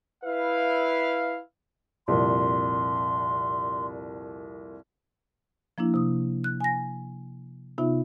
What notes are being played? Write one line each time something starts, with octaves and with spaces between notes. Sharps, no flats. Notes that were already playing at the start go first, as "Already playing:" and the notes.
E4 B4 E5 F5
C2 F2 A#2 C6
F3 A#3 D4 E4
C3 D#6
F#6
G#5 A#6
C3 B3 D#4 F4 E5